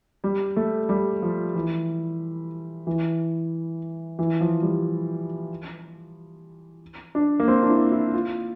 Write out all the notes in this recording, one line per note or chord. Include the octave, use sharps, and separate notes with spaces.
G3
A3
G3
F3
E3
E3
E3
F3
G3
D4
A#3
C4
D4
E4
E4
F4